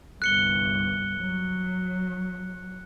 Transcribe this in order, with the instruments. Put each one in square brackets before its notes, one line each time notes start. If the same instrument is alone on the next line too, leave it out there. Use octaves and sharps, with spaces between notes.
[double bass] G1 C2 [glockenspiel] F#6 C#7 G7
[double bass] F#3